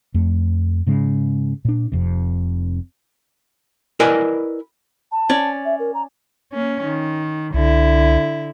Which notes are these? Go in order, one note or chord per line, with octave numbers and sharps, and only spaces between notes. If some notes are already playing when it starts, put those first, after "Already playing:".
F2 A3
G#2 C#3 G#3
A#2 D4
F1 F2 C3
E4 A#4 B4 D5 D#5 G#5
A5
C#4 D5
E5
A#4
A#5
A#3 C#4
D#3
C2 D3 E4